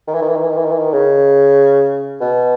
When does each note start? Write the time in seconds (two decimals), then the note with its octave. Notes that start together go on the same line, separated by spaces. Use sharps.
0.08 D#3
0.15 E3
0.22 D#3
0.29 E3
0.36 D#3
0.43 E3
0.50 D#3
0.57 E3
0.65 D#3
0.72 E3
0.79 D#3
0.93 C#3
2.21 B2